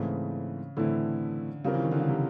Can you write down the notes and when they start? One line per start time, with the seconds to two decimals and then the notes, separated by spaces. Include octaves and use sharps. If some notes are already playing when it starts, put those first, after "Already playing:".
Already playing: G#2 C#3 E3 A3 C4
0.77 A2 D3 E3 A3 C4 E4
1.64 C#3 G3 C4 F4 A#4
1.74 E3
1.83 D#3
1.91 D3
2.00 C#3
2.08 C3